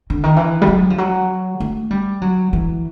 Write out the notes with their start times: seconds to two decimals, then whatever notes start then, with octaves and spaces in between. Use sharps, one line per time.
0.10 D3
0.23 D#3
0.36 E3
0.62 G3
0.67 F#3
0.90 F3
0.98 F#3
1.60 A3
1.91 G3
2.22 F#3
2.53 E3